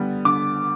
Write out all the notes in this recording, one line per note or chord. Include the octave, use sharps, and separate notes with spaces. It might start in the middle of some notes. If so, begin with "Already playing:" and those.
Already playing: D3 G3 B3
D3 D6